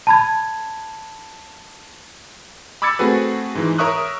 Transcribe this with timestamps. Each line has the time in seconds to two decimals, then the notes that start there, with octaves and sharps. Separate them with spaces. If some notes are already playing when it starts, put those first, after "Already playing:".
0.07 A5 B5 G#6
2.82 B5 D6 E6 G#6 A6 C#7
2.99 A3 C4 F#4 G#4 B4
3.55 G#2 E3 G#3
3.78 A#4 C#5 E5 C#6 D#6 F#6